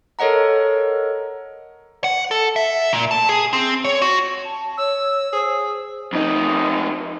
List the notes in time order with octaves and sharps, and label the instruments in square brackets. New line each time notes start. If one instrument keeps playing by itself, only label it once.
[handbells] A4 A#4 C#5 D#5 F#5 A#5
[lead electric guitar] F#5
A4
E5
A#2
A5
G#4
C4
C#5
F#4
[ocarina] A5
[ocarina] C#5 [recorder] E6
[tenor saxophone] G#4 [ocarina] C5
[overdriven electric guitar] F2 D#4